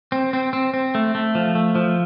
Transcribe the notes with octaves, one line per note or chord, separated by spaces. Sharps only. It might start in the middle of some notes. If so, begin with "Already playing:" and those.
C4
C4
C4
C4
A3
A3
F3
A3
F3